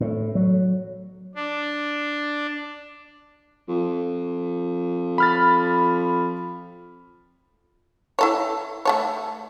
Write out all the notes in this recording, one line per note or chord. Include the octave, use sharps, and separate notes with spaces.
A2
F#3
D4
F2
B5 F6 A6
E4 A4 C#5
A3 A4 C#5